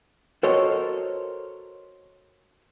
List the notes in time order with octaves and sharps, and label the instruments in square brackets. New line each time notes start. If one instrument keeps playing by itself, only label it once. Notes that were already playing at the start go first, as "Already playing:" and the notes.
[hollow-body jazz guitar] F#4 A4 A#4 C5 C#5 D#5